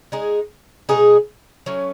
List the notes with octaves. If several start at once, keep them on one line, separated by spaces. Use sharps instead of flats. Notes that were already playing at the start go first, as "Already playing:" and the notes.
G#3 D#4 G#4
B2 G#3 D#4 G#4
F#3 A3 C#4